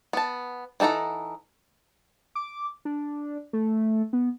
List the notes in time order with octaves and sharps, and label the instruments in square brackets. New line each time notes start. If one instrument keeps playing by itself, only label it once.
[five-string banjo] B3 A5
E3 D#4 A4 F#5 A#5
[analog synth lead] D6
D4
A3
B3